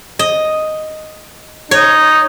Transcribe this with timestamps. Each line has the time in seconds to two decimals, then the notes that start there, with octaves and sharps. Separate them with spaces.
0.19 D#5
1.71 D#4 C#5